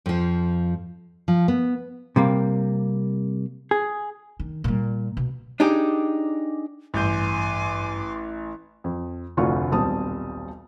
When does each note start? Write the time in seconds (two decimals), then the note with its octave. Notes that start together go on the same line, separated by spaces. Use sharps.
0.06 F2 F3
1.28 F3
1.48 B3
2.16 C3 G3 A#3
3.71 G#4
4.40 D#3
4.64 A#2 G3
5.17 B2
5.60 D4 D#4 G4 G#4
6.94 A1 G2 G#5 C6 D6 G6
8.84 F2
9.37 F1 D2 D3 F4 C#6
9.71 D#1 B1 G3 C4 A5 D#6